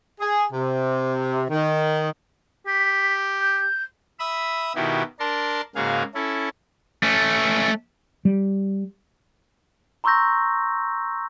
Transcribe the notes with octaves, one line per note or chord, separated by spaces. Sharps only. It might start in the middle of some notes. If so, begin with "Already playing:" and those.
G#4
C3
D#3
G4 B6
G6
E5 B5 D#6 E6
B2 D#3 E4 F#4 G4
D4 A#4 A5 C6
G#2 C#3 A#3 F#4 G#4 F5
C#4 E4 A4
A3 C#4
G3
A#5 C6 C#6 E6 G6 A#6